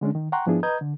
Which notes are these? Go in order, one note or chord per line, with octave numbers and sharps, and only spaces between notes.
D3 G#3 C#4 D4
D#3
F#5 G5 A#5 C6 C#6 F#6
G#2 F3 B3 D4 E4 G#4
B4 D#5 A#5 D#6 G6 G#6
D3